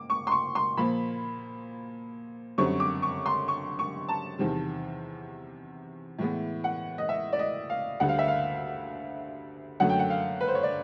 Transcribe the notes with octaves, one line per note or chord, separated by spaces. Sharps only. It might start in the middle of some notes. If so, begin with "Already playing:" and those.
Already playing: A#3 D6
C#6
C6
C#6
C6
A#2 F3 A#3 B5
F#2 D3 G3 C4 C#6
D6
C#6
C6
C#6
C#6
A5
E2 C3 D#3 G3
A2 E3 G#3 B3
F#5
D#5
E5
D5
D#5
F5
D2 D3 G3 F#5
F5
E5
F5
F#2 D3 F#3 A3 F#5
G5
F#5
F5
B4
C5
C#5
D5